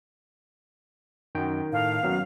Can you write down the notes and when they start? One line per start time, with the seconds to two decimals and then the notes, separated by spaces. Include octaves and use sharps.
1.35 F#2 D#3 G5
1.72 A2 F5
2.03 D#1 F#2 F#3 B3